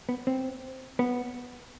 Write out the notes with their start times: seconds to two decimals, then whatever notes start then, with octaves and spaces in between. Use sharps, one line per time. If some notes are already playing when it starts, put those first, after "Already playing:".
0.09 B3
0.27 C4
0.99 B3